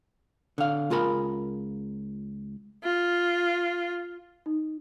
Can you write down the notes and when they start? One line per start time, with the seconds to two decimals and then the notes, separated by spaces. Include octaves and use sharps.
0.58 D3 F5
0.90 C#2 F4 G#4 A#4 B5
2.84 F4
4.46 D#4